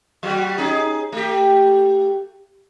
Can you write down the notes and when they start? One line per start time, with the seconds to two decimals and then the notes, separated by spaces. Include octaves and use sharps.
0.23 F#3 G3 F#4
0.58 C#4 D#4 G#4
1.12 A3 G4